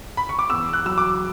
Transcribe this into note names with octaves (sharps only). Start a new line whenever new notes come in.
B5
C#6
D6
E2 E6
F#6
F#3 E6
D6